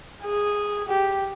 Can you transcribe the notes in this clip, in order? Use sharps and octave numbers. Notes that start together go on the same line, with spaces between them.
G#4
G4